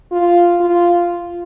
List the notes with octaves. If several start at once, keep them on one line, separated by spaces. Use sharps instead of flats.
F4
F4